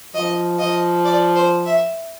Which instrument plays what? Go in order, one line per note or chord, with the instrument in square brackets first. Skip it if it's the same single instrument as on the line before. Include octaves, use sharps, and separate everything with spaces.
[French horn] F3 [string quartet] D#5
[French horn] F3 [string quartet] D#5
[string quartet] D5
C5
E5